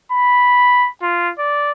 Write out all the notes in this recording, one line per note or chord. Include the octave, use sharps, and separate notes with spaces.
B5
F4
D5